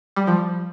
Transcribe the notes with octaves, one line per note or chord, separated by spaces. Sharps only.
G3
F3